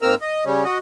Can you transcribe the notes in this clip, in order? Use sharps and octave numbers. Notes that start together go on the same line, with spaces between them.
G#2 A#3 C4 A#4 E6 F6
D#5
C#3 G3 C#4
F#4 D#5